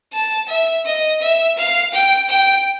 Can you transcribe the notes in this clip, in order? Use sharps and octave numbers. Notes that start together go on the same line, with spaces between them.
A5
E5
D#5
E5
F5
G5
G5